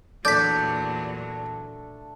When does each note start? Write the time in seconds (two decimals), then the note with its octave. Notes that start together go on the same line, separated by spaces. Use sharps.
0.25 E2 A#2 F#3 A3 D4 D5 G6 B6